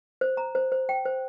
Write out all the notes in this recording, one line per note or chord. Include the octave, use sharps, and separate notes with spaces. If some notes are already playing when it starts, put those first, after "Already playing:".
C5
A#5
C5
C5
G5
C5